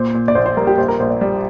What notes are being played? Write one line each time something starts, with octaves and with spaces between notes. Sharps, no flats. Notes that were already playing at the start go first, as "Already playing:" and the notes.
Already playing: A#2 C5
A#2
D5
A#1 C5
C5
G3 A#4
G4
A#1 C5
A#4
A#1 C5
D5
G3